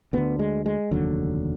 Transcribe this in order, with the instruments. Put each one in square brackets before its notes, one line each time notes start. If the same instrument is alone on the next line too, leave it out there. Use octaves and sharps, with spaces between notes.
[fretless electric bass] D2 D3 B3
G#3
G#3
F1 D#2 D3 F#3